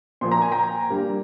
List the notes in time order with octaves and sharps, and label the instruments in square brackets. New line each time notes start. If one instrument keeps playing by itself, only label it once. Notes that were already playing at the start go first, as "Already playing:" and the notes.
[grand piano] A#2 F3 A#3 C6
A#5
G#5
G5 A#5
G2 G3 A#3